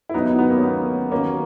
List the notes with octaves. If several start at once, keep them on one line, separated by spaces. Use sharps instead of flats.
E4
D#2 D#3 F#3 B3 D#4
B3
B3
A#3
C#4
B3
D#2 D#3 F#3 A#3 C#4